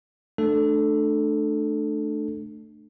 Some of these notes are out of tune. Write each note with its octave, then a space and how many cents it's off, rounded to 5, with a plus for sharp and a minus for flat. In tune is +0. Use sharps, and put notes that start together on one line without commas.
A3 +0 D4 +25 A4 +0